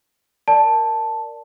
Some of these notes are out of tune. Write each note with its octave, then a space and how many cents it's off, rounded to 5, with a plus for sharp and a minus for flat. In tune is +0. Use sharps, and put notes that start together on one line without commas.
A#4 +0 D5 +0 A5 +0